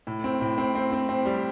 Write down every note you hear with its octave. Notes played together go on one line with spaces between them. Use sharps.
A2
C4
A2
C4
C4
C4
C4
G3